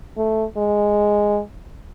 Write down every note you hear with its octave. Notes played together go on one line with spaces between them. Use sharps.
A3
G#3